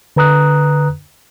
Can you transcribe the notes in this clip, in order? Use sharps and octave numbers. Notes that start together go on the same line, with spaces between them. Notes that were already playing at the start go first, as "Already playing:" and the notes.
D3 B4 A#5 D#6 F#6